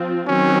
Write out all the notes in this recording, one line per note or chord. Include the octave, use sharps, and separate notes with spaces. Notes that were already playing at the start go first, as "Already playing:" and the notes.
Already playing: F3 C4 F4
D#3 F#3 C4 C#4 F#4